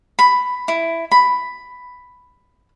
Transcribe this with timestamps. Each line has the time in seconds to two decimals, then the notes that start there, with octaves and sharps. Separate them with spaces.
0.19 B5
0.68 E4
1.12 B5